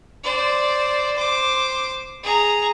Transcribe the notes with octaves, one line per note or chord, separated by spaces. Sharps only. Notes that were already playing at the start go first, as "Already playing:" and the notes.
C5 D5
C5 D6
G#4 A#5